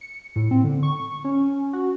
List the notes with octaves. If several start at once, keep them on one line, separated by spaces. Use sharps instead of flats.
C#7
A2
C4
D3
C#6
C#4
F#4